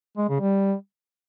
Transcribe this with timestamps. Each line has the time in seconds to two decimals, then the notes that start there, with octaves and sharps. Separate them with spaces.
0.17 G#3
0.29 C#3
0.40 G3